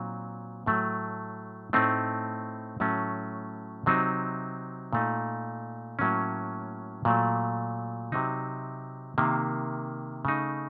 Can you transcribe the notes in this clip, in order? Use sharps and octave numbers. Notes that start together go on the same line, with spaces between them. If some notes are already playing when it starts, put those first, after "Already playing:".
Already playing: A#2 F#3 C4 D#4
A2 F#3 A3
A2 A3 C4 D#4
A2 F#3 A3 C#4
C3 F#3 C4 D#4
A#2 A3 D#4
A2 F#3 A#3 C#4
A#2 F#3 A3
C3 F#3 C4 D#4
C3 D#3 A#3
C#3 A3 D#4